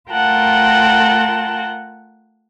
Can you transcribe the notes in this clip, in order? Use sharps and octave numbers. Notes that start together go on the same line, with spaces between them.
A3 F4 A#4 F#5 G5 A5